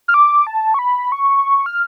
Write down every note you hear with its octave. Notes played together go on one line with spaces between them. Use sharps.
F6
D6
A5
C#6
B5
C#6
F6